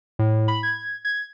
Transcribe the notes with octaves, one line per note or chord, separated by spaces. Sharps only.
A2
B5
G#6
G#6